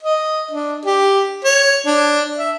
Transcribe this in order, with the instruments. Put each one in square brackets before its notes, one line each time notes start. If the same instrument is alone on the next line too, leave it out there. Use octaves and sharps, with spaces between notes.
[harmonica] D#5
D4
G4
C#5
D4
E5